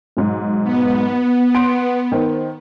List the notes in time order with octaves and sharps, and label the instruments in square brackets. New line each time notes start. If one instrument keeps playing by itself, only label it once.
[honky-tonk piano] B1 G#2
[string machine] B3
[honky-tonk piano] F#5 C6 D7
D#3 C5